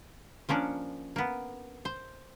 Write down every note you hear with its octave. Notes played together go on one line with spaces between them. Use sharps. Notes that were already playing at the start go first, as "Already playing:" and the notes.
F3 A#3 C#4 D4
A#3 B3
C5